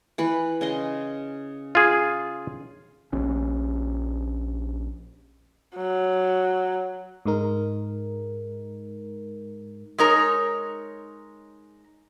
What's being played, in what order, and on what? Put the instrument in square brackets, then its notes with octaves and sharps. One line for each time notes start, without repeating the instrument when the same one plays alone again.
[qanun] E3 B4 B5
C#3 D#5 C6
[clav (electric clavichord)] F4 G#4
[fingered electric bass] A#1 C#4
[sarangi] F#3
[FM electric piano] G#2 G#3 D#4 A#4
[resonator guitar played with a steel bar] G#3 D#4 A#4 C#5